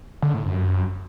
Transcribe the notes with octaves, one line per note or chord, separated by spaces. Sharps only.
D3
A2
F#2